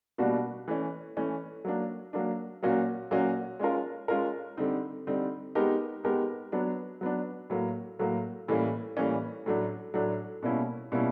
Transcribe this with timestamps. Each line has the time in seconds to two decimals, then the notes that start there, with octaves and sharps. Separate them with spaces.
0.18 B2 G3 A#3 D4 F#4
0.68 E3 A3 C#4
1.17 E3 A3 C#4
1.65 F#3 A#3 D4
2.13 F#3 A#3 D4
2.63 A#2 F#3 A#3 C#4 F#4
3.11 A#2 F#3 A#3 C#4 F#4
3.59 G#3 C#4 F4 A#4
4.08 G#3 C#4 F4 A#4
4.57 D3 G3 C4 D#4
5.07 D3 G3 C4 D#4
5.55 G#3 B3 D#4 G4 A#4
6.04 G#3 B3 D#4 G4 A#4
6.52 F#3 B3 D4
7.01 F#3 B3 D4
7.50 A2 F#3 A#3
7.99 A2 F#3 A#3
8.48 A2 E3 G3 A#3 C#4
8.97 A2 E3 G3 A#3 C#4
9.46 A2 F#3 A3 D4
9.94 A2 F#3 A3 D4
10.43 B2 G3 A#3 C#4 E4
10.92 B2 G3 A#3 C#4 E4